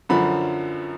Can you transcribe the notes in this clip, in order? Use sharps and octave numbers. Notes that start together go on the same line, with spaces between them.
F#2 D3 F3 B5